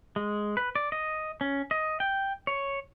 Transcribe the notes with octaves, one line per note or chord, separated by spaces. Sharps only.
G#3
B4
D5
D#5
C#4
D#5
G5
C#5